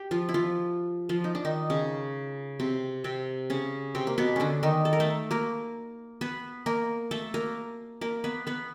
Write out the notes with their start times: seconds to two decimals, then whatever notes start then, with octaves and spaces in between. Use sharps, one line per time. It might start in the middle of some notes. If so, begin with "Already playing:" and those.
Already playing: G4
0.11 F3 F4
0.29 E4
0.34 F3 F4
1.09 F3 F4
1.24 D#4
1.35 D4
1.45 D#3 D#4
1.70 C#3 C#4
2.60 C3 C4
3.04 C3 C4
3.50 C#3 C#4
3.95 C3 C4
4.07 A#3
4.18 B2 B3
4.36 D3 C#4 D4
4.63 D#3 D#4
4.85 A4
4.93 A#4
5.00 A3 A4
5.31 A#3 A#4
6.21 B3 B4
6.66 A#3 A#4
7.11 A3 A4
7.34 A#3 A#4
8.01 A#3 A#4
8.24 B3 B4
8.47 B3 B4